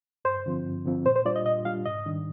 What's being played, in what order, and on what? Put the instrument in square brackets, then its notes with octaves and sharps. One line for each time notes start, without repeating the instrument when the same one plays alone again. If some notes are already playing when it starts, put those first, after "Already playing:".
[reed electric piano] G2 [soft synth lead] C5
[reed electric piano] D3 F3 C4 F4
G2
D3 F3 C4 F4
[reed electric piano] A#2 [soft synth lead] C5
[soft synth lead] C5
[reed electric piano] G3 D4 F4 [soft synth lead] D5
[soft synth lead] D#5
[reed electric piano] A#2 [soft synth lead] D#5
[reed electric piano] G3 D4 F4 [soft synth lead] F5
[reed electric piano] G#2 [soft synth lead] D#5
[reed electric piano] D#3 G3 D4